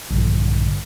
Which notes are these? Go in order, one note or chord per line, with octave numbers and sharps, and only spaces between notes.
A#1 G2 D3